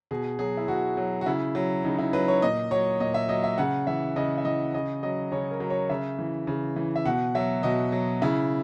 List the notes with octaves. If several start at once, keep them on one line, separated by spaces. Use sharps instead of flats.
B2 G#4
F#3 G#4
E4
B2 F#4
F#3
F#4
C#3 E4
F#3
C#3 D#4
E4
F#3 B4
C#5
A#2 D#5
F#3 C#5
A#2 D#5
E5
F#3 D#5
E5
C#3 F#5
E3 E5
C#3 D#5
E5
E3 D#5
C#3 D#5
F#3 D#5
C#3 C#5
A#4
F#3
C#5
C#3 E5
E3
C#3
E3
E5
B2 F#5
F#3 E5
B2 D#5
F#3
C#3 E4